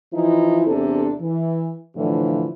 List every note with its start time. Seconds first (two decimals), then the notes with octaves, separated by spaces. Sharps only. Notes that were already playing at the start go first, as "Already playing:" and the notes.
0.14 E3 F3 D#4 E4
0.66 E2 C3 D4 A4
1.21 E3
1.96 A2 D3 E3 F3